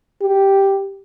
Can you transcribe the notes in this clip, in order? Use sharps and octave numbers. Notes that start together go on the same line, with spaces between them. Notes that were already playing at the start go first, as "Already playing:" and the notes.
G4